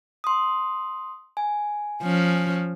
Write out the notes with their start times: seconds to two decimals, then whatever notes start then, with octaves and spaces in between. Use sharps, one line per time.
0.24 C6 D#6
1.37 G#5
2.03 F3 C#4